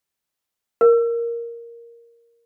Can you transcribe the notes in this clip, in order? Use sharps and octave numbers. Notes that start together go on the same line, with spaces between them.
A#4